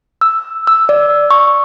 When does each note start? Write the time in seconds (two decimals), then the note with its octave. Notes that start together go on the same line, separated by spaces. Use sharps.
0.21 E6
0.67 E6
0.89 D5
1.31 C#6